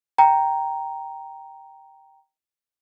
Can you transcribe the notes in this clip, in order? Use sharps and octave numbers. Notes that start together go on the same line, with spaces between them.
G5 A#5